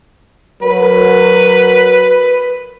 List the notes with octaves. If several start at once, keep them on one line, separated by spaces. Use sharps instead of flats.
F#3 A#4 B4